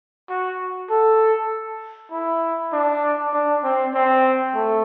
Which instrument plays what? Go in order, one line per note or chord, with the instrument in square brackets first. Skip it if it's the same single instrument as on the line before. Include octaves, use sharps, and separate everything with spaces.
[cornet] F#4
A4
E4
D4
D4
C4
C4
A3